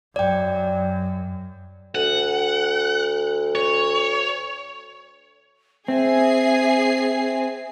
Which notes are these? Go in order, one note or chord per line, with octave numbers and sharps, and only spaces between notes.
F#2 D5 G5
D2 F#5
C#5
C4 G#4 E5 G#5 C7